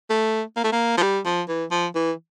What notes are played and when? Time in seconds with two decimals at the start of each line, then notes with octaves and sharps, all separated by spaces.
0.09 A3
0.56 A#3
0.64 A3
0.72 A#3
0.97 F3
1.02 G3
1.25 F3
1.48 E3
1.71 F3
1.95 E3